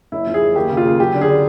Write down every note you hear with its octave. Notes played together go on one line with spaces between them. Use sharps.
F#1 E4
F3
G#4
F#1
D#2 G4
C#3
F4
C#3
F#3 G4
D3
G#4
D3